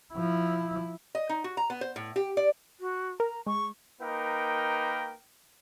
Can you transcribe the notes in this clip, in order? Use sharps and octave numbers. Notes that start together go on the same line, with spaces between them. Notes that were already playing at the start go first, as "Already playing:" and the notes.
F3 E4
D#5
D#4
F#4
A#5
B3
C5
A2
G4
D5
F#4
A#4 A#5
G#3 C#6
A#3 D#4 A#4 B4 G5